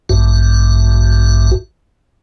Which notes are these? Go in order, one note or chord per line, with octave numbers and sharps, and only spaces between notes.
A1 G2 F#4